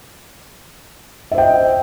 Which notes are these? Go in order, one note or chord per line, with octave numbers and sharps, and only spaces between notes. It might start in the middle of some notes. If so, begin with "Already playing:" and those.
C5 D#5 E5 G5